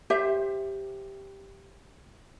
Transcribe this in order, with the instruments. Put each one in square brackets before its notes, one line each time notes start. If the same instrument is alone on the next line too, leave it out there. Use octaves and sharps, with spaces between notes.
[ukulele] G4 C5 E5